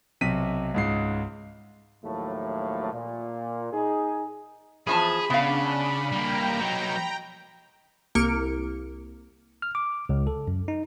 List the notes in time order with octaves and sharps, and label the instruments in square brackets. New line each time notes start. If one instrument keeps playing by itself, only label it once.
[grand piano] B1 C3 B6 D#7
C#2 G#2 C7
[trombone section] D#2 A2 F3 F#3 A3 A#3
A#2
D#4 G#4
[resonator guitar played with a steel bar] E2 F3 A5 [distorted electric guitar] G#4 [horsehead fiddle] B5
[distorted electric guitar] C#3 [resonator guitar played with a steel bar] B3 F5 [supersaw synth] D4
[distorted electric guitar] G3 A#3 [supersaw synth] G5 A#5
[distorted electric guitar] F#3 D#4
[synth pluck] C2 A#3 F6 C#7 D7
[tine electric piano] F6
D6
C#2
A4
F#2
D#4